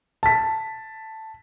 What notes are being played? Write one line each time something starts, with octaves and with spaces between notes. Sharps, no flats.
A5 B6